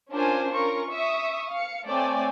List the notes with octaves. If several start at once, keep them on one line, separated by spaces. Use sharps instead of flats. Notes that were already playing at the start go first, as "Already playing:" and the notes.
C#4 D4 F4 A#4 C5 G#5
C#4 F4 A#4 C#6
E5 C#6 D#6
F5 C#7
A3 C4 C#5 D5 G5 G#5